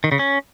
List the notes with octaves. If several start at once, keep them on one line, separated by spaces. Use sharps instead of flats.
D#3
C#3
C#4